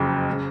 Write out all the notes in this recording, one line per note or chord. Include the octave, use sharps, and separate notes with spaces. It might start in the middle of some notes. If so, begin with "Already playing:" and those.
Already playing: F#1 F2 C#3
C#3